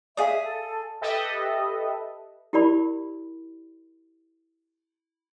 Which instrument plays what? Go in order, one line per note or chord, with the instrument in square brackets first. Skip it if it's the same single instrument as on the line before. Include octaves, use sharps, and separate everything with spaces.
[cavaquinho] G#4 D#6 [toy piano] D5 F5 [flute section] E5
[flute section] A4
[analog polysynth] G4 A4 B4 D#5 E5
[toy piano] E4 G4 A#4 D5 B5